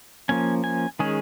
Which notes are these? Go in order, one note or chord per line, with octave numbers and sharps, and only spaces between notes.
F3 A#3 C#4 G#5
G#5
D#3 G#3 C#4 G#4